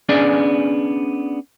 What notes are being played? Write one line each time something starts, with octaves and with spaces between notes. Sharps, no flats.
B3 C#4 D4 G#4 D5 G#5